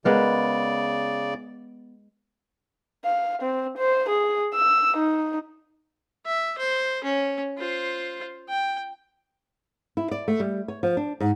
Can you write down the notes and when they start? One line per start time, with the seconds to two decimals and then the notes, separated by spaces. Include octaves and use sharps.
0.05 C#3 G#3 B3 A#4 D5
3.05 F5
3.42 C4
3.78 C5
4.09 G#4
4.54 E6
4.96 D#4
6.26 E5
6.58 C5
7.04 C#4
7.58 F4 C5
8.49 G5
9.97 E4
10.11 D5
10.28 A3
10.40 G3
10.68 C#5
10.83 F3
10.97 D4
11.20 G#2